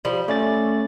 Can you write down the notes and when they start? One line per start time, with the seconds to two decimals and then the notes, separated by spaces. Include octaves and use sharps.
0.05 F3 G3
0.28 A3 C#4 D5 A6